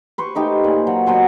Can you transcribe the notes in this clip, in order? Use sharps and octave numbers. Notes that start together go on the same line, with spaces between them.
B4 C5 C#6
A3 D#4 G4
A#2 D5 G#5
F#3
B2 F#3 C5 G#5